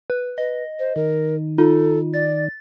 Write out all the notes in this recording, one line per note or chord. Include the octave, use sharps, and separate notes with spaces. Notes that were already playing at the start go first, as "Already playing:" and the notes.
B4
B4 D#5
C5
D#3 A#4
D#4 F4 A4
D5 A6